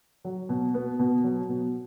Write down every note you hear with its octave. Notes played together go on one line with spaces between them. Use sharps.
F#3
B2
B3
B2
F#3
B2